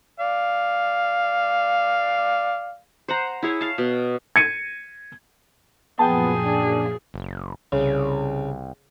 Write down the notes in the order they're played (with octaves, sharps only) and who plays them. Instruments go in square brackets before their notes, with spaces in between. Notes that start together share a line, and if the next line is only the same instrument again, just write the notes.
[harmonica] D5 F5
[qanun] C5 F#5 A#5
E4 G#4 C#5
F5 A5
B2
[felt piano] G#6 C#7 D#7
[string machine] F#2 A#2 F3 [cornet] B3 [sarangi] G#4 [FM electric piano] G5 A5
[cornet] D4
[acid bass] F#1
[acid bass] C2 [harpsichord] C#3